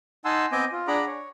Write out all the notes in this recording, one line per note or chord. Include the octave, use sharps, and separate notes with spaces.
D#4 F#5 G#5 A5 C6 E6
B3 C4 D#5 G#5 D6 G6
F4
D4 G#4 F#5 A#5 B5 D6
C#5